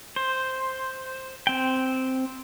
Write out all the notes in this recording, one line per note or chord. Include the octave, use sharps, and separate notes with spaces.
C5
C4 G5